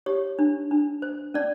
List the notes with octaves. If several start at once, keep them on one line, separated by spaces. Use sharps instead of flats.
G4 C#5
D4
D4
C5
C#4 D5